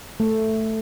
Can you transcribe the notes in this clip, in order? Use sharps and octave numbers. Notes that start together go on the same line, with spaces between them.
A3